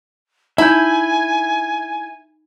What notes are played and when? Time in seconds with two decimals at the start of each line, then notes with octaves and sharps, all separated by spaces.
0.58 D#4 E4 E5 G#5 A#5 G6